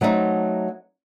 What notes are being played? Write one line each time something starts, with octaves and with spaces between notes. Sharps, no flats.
F#3 A3 C4 D#4